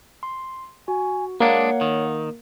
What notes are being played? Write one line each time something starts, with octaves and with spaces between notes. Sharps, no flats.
C6
F#4 G#5
G#3 A#3 D4 C#5 F5 F#5
D#3